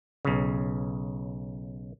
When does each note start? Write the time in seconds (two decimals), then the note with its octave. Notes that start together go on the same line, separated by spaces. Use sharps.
0.25 B1 C#3